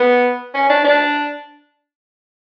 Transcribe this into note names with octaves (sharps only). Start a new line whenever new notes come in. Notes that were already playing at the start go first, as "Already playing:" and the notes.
Already playing: B3
C#4
D4
D4